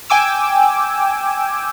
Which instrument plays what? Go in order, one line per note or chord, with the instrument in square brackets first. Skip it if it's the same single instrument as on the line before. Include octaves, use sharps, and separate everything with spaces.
[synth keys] G5 G#5 D6 E6